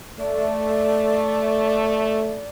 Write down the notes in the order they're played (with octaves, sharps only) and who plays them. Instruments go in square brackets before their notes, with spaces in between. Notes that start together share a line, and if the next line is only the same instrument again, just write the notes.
[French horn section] A3 [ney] D5